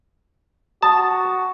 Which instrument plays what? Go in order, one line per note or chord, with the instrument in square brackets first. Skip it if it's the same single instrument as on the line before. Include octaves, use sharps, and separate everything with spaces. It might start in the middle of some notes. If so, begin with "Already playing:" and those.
[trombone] F#4 [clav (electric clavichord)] A5 [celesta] D#6